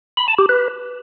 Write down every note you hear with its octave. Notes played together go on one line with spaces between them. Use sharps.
B5
A5
G4
B4